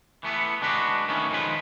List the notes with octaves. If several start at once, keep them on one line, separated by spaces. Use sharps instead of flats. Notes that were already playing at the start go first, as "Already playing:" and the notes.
E3 A3 B3
G#3 D4 F#4 B4
D#3 A3 B3 C#4
D#3 F3 G#3 B4